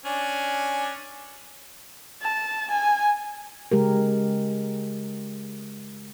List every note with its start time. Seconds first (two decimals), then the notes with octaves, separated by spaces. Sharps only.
0.05 C#4 D4 G#5
2.22 A5
2.71 G#5
3.72 C#3 G#3 G4 A#4